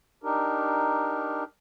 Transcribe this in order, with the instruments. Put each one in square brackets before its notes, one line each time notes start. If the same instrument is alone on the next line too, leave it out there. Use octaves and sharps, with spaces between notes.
[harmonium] D4 D#4 G4 A#4